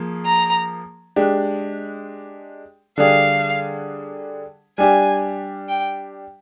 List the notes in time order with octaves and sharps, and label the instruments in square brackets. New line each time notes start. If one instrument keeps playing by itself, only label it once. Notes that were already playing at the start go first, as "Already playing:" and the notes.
Already playing: [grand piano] F3 A#3 G#4
[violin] A#5
[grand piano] G#3 D4 G4
[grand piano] D3 G3 D4 G#4 [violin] F5
[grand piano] G3 D4 G4 [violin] G#5
[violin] G5